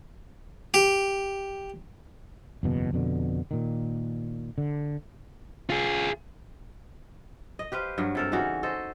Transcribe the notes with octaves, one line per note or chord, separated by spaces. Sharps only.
G4
F#1 E2 B2
F2 B2 D3
A#2 D#3
D3
F4 G#4
D#5
G4 B4 C5 F5
G2 F#3
C3 A4 A#4
C#3 E3 D#4 F#4
A4 C5 D#5